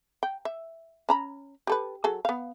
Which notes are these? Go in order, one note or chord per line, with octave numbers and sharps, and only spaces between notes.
G5
E5
C#4 A#5 B5
G4 A4 B4
F#3 G#4 A4
B3 F5